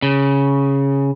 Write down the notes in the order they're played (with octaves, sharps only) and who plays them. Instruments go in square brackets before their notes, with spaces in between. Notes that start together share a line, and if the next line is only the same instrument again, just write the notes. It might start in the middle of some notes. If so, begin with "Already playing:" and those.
[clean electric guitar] C#3